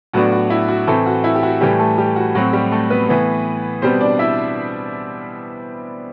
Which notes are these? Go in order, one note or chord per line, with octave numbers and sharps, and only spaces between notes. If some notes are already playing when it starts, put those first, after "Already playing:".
A2 F#3 B3 D4 F#4
F#4
E4
F#4
A2 E3 A3 C4 A4
F#4
E4
G4
F#4
A2 E3 G3 A3 G4
A3 A4
G3 G4
F#4
A2 F#3 C4 F#4
G3 G4
A3 A4
B3 B4
A2 E3 B3
B2 G3 B3 C4 C5
D4 D5
E4 E5